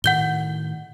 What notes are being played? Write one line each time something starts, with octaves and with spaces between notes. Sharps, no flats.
A2 D#3 F#5 G6 G7